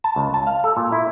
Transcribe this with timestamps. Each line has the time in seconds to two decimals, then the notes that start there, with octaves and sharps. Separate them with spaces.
0.04 A5
0.16 C#2
0.34 A5
0.47 F5
0.64 A4
0.77 A#2
0.92 E4